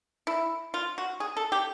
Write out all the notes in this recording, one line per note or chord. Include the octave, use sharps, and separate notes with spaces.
E4
F4
F#4
G#4
A4
G4